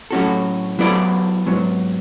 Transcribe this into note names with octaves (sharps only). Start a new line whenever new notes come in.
A2 F#3 C#4 F#4 A4
F#3 B3 E4 A4 D5
G#2 F#3 B3